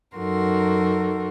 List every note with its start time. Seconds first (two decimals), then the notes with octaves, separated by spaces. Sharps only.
0.16 F#2 D#4 F#4 A4 A#4 C6